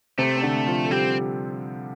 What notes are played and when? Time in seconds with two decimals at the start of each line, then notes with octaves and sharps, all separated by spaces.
0.18 C3 A3 C4
0.37 C4
0.42 D3 D4
0.67 F3 F4
0.85 A4
0.91 G3 C4 G4